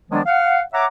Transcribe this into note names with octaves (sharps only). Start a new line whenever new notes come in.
D#3 F3 F#3 G#3 B3 D4
F5 F#5
C#5 E5 F#5 A#5 D6